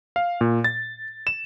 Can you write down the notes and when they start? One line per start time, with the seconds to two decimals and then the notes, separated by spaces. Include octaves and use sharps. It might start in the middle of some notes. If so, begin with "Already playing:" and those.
0.16 F5
0.41 A#2
0.64 A6
1.27 E7